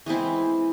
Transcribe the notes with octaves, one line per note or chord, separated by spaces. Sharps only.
E3 G#3 C4 E4